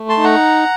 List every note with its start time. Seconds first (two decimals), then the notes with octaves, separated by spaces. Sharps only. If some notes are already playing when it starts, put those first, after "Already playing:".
Already playing: A3
0.09 A5 C6
0.17 D#4
0.24 F#5 A#5